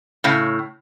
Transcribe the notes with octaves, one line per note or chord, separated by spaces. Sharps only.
A2 C#3